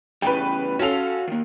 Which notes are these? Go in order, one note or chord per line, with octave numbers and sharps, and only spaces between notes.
E2 C#3 G3 B4 G5
C#4 F#4 A4 F5 F7
D#3 A#3